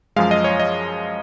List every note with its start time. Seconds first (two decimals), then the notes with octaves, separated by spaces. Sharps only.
0.16 F#2 F3 G#3 F5
0.31 D#5
0.44 C#5
0.60 D#5